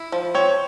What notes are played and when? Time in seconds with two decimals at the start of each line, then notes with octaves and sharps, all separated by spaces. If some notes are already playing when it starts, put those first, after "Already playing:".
Already playing: E4
0.12 F3
0.35 C4 C#5